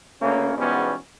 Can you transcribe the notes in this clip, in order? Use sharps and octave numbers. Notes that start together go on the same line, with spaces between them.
D2 C#3 A#3 C#4
E2 G#2 B2 G3 B3 C#4